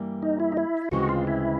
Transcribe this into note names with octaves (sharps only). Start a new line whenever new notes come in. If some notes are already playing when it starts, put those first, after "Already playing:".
Already playing: G2 E3 G3 A#3
D#4
E4
D#4
E4
D2 C#3 E3 G#3 C4 F#4
F4
E4